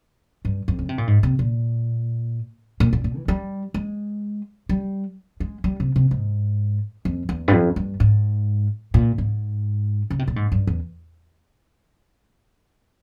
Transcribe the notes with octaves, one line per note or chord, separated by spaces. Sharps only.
G2
F2
C#3
C3
A#2
G#2
C3
A#2
A#2
A#2
A#2
E3
G3
G#3
G3
G#3
G3
C3
C3
G#2
F2
E2
G2
F2
G2
G#2
A#2
G#2
C#3
C3
A#2
G#2
G2
E2